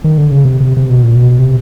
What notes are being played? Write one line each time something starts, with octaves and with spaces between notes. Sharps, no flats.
D#3
D3
C#3
C3
C3
C3
B2
A#2
B2
C3